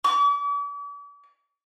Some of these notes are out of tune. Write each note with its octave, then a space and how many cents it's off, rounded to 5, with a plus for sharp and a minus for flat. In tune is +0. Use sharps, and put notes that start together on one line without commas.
D6 -45